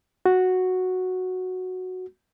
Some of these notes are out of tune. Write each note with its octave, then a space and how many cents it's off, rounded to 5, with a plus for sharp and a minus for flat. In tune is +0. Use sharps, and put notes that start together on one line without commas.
F#4 -5